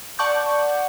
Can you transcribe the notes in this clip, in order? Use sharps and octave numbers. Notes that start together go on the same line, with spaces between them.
D5 F#5 A5 C#6 D6 G6